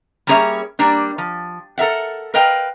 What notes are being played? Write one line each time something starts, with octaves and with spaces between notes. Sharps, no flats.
G3 A#3 C#4 G#4 C#5 E5
G3 A#3 D4
F3
A4 A#4 E5 F#5
A#4 B4 D#5 F5 G5